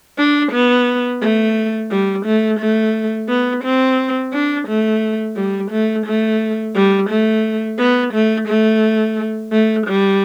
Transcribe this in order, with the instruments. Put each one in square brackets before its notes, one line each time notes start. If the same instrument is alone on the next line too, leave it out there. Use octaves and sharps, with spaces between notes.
[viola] D4
B3
A3
G3
A3
A3
B3
C4
D4
A3
G3
A3
A3
G3
A3
B3
A3
A3
A3
G3